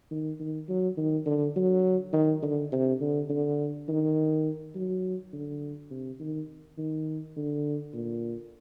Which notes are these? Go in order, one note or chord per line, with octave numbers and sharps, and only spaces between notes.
D#3
D#3
F#3
D#3
D3
F#3
D#3
D3
C3
D3
D3
D#3
F#3
D3
C3
D#3
D#3
D3
A#2